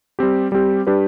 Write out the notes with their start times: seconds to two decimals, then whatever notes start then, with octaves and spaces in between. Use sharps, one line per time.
0.19 G3 C4 G4
0.52 G3 C4 G4
0.87 G3 D4 G4 B4